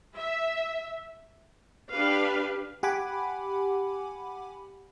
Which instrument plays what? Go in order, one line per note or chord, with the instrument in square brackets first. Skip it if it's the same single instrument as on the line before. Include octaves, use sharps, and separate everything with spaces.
[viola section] E5
D4 G4 B4 F5
[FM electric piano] G4 F#5 G#5 B5 D6